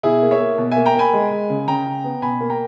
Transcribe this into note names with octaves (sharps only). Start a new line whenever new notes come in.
B2 E4 G#4
A#3
C#5 E5
A#3
B2
A#3 E5 G#5
G5 A#5
A#3 G#5 B5
G#3
G#3
C#3
C#3 G5 A#5
C#3
B3
B2 G#5 B5
A#3
G5 A#5